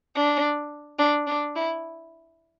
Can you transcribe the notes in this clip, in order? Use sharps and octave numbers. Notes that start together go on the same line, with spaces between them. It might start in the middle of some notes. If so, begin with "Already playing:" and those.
D4
D4
D4
E4